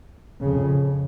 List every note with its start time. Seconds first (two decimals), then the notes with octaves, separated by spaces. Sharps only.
0.40 F2 C#3